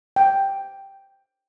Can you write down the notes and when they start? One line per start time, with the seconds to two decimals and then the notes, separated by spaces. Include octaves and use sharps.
0.16 G5